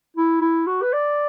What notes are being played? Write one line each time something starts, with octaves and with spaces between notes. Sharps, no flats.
E4
E4
F#4
B4
D5